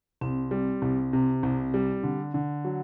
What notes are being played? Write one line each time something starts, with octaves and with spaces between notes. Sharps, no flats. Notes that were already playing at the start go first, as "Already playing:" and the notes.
C2 C4
G3
C2
C3
C2
G3
D3
D3
F#3